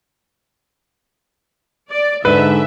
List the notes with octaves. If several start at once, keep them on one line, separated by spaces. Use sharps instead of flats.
D5
G#2 D3 B4 E5